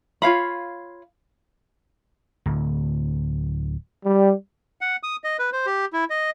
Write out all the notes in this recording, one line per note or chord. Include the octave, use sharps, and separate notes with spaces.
F4 C#5 F5 B5
D1 D2
G3
F#5
D#6
D#5
B4
C5
G4
E4
D#5